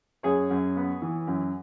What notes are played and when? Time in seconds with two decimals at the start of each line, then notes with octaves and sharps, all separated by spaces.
0.23 F#2 G#4 C#5
0.50 F#2
0.76 B3
1.02 E3
1.27 F#2